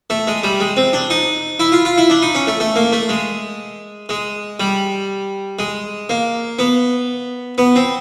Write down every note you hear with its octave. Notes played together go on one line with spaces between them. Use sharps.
A3
G#3
G3
G#3
C4
D4
D#4
E4
F4
F4
E4
D4
D#4
C#4
A3
A3
A#3
A3
G#3
G#3
G3
G#3
A#3
B3
B3
C4